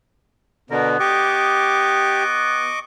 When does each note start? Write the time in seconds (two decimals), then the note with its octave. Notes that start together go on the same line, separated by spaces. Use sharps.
0.70 B2 D3 B3 A#4
1.00 G4 D#5 C#6 D6